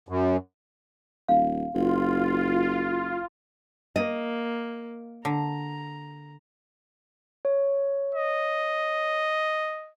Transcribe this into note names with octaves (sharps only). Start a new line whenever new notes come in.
F#2
D#1 F5
F#1 F4
A#3 D#5
D3 A#5
C#5
D#5